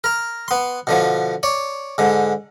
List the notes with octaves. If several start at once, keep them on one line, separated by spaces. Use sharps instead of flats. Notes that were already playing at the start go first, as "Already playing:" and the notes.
A#4 A#5
B3 C6
B2 D3 F3
C#5 D5
G#2 D3